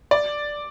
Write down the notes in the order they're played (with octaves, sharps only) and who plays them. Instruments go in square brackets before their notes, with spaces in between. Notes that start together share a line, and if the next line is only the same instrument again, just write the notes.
[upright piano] D5